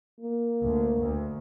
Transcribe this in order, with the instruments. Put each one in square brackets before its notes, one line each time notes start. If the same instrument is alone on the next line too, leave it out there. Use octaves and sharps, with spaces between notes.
[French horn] A#3
[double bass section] D2
D2